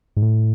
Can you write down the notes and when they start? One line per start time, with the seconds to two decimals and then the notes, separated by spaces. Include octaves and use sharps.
0.17 G#2
0.22 A2